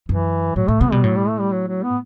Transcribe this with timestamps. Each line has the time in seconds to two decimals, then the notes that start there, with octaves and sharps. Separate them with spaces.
0.09 F#2 E3
0.56 A2 F#3
0.68 A2 A3
0.81 C3 B3
0.92 B2 G3
1.03 A2 F#3
1.15 G3
1.28 A3
1.40 G3
1.52 F#3
1.68 F#3
1.83 B3